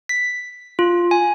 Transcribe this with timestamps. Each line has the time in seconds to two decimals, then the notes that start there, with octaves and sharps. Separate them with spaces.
0.09 B6
0.79 F4
1.11 G#5